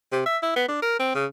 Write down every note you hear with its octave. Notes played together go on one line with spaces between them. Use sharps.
C3
E5
E4
B3
D4
A#4
C4
C#3